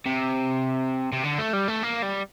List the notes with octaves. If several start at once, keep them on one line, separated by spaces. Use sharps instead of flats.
C3
C3
D3
A3
G3
A3
A#3
G3